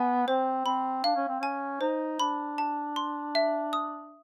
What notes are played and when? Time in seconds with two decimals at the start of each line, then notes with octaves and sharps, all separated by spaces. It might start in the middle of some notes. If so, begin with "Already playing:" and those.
Already playing: B3 G#5
0.27 C4 C5
0.65 C4 B5
1.04 D4 F5
1.16 C#4
1.28 C4
1.40 C#4 G#5
1.81 D#4 C5
2.20 D4 B5
2.58 A5
2.96 C6
3.35 E5
3.73 D#6